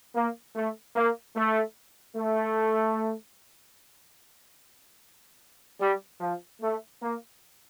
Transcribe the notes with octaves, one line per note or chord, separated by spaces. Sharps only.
A#3
A3
A#3
A3
A3
G3
F3
A3
A#3